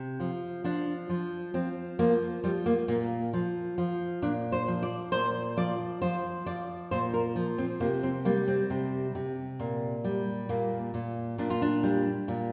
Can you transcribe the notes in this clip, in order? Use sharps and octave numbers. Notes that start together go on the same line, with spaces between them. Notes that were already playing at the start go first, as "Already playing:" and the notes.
Already playing: C3
F3
F3 D4
F3
F3 C4
F3 A#3
F3 G3
A#3
A#2 A#3
F3
F3
A#2 D4
C5
F3
D5
A#2 C5
F3 D5
F3 C5
F3 D5
A#2 C5
A#4
F3
C4
C3 A#3
C4
G3 A#3
C4
C3
C3
A#2
G3
A#2 A#3
A#2
A#2 D4
F4
D4
G3
A#2